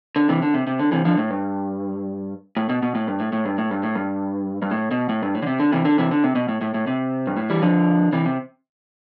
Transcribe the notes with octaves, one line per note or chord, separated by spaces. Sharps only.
D3
C3 E3
D3
C3
C3
D3
C3 E3
D3 F3
A2
G2
A2
B2
B2
A2
G2
A2
A2
G2
A2
G2
A2
G2
G2
A2
B2
A2
G2
A2
D3
C3
D3
C3 E3
D3
C3 E3
D3
C3
B2
A2
A2
A2
C3
G2
A2
E3 G3
D3 F3
C3 E3
C3